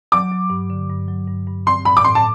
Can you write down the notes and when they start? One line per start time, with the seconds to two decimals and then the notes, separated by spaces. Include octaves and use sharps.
0.12 F#3 D6
0.32 F#3
0.50 G2
0.70 D3
0.89 G2
1.08 F#3
1.27 G2
1.46 G2
1.66 C4 C6
1.85 A2 B5
1.97 D6
2.04 A2 C6
2.15 A5